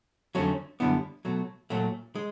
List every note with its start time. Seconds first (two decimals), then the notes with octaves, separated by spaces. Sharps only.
0.35 F2 D3 F#3 A3 C#4
0.80 F#2 D3 G3 B3 E4
1.25 B2 F#3 A3
1.70 A#2 F#3 A3
2.15 G#3